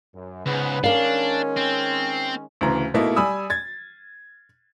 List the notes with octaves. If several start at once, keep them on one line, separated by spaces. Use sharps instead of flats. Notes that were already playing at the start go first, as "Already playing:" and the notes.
F#2
C#2 G#2 B3 B4
D#3 G#3 C#4 D4 A#4 F5
C4
D2 C#3 E3 A#5
B2 A3 A#3 D#4 E4
G3 G#5 B5 D#6 E6
G#6 A6